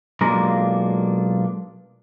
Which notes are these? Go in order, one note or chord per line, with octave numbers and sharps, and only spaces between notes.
B1 G#3 A#3 D4 F4 A#5